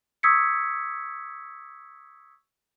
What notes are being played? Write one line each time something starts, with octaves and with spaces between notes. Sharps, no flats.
C#6 D#6 E6 G#6 B6 C#7